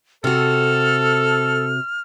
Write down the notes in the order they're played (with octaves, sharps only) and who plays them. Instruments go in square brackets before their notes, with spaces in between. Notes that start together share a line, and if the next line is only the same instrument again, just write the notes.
[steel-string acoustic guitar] C3 F#4 [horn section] A4 [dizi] F6